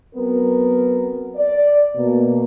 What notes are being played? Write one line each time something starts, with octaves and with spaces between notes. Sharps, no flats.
F#3 B3 C4 A#4
D5
B2 A#3